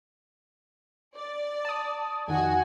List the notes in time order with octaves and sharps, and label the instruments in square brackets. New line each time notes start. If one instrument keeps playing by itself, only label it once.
[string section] D5
[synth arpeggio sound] A5 D#6
[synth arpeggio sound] F2 D#3 [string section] F#4 G#5